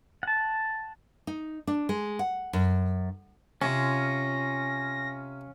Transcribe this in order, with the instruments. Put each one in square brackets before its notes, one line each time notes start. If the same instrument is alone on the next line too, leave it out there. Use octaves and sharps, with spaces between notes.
[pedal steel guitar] F#5 A5
[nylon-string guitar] D#4
D4
G#3
F#5
F#2
[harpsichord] C3 [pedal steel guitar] C#4 F4 [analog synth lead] A#6